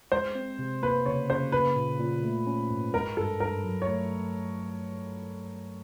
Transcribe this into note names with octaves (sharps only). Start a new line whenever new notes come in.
G#3 C5
C4
C3
A#3 B4
C#3 C#5
C#3 C5
A#3 B4
A#2
A#2
A3
C#4
G#2
G#3 A#4
G2 A4
G2 A#4
F#3
C#5
A3